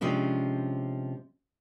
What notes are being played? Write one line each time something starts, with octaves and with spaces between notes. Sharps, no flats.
C3 F3 G#3 C#4 D4